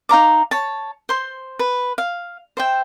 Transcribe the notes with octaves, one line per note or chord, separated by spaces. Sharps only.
D#4 F5 A#5 D6
C#5 A5
C5 C6
B4
F5
C5 E5 G5